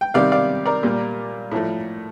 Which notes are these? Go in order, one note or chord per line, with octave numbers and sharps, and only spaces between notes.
G5
C3 D#3 G3 D5 F5
D5 F5
A#4 D5
A#2 G3 A#3
A2 F3 A3